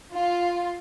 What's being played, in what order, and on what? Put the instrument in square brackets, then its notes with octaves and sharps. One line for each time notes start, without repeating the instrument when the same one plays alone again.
[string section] F4